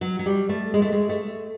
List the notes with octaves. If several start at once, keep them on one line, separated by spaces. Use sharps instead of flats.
F#3
F#3
G3
A3
G#3
A3
G#3
A3